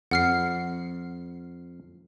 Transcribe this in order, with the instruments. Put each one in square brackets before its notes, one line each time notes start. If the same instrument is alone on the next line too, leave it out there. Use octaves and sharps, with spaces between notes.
[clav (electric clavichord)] F2 [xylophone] F#5 F6 C7